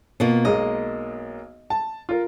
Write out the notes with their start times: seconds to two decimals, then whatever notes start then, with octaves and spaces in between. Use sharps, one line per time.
0.20 B2 A#3 F4
0.45 B1 G#3 A#3 D#5
1.70 A5
2.09 F4 A#4